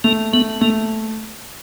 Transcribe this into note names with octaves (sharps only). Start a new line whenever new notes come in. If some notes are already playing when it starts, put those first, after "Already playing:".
A3 A#3
A3 B3
A3 A#3